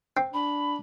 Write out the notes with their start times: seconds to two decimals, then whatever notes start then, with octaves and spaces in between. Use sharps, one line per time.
0.17 C4
0.33 D4 B5